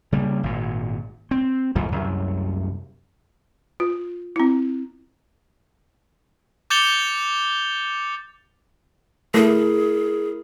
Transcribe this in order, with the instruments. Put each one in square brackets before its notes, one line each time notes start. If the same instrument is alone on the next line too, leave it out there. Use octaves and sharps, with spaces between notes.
[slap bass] C#3 G3 A#3
G#1 A#2
C4
F2 G#2 E3 F3
C2 F#2
[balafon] F4
C4 E4
[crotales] D6 G6 A6 C#7 F7 G7
[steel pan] A3 [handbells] E4 A#4 [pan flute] G#4